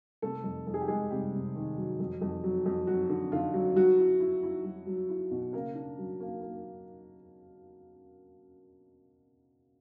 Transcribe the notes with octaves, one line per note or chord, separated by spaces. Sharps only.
C3 A3 A4
F2
F2 A4
G#4
G4
F2 G#3 G#4
C3 G3 G4
C3
D#3
F#3
F2
F2
F#3
F2
F#3 F#4
D3
D3 F4
F#3
F#3 F#4
E4
E4
E4
F#3
F#3
E4
B2
C#3 A#3 A#4
D4
F#3
A#3
A#3